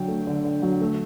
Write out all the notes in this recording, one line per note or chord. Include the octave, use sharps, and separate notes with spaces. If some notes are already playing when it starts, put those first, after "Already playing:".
Already playing: D3 F#3 G5
A3
D3
D3
F#3
A3